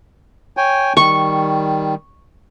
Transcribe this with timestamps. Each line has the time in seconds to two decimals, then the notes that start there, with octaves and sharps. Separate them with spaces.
0.57 C#5 G5 G#5
0.97 D#3 G3 C#6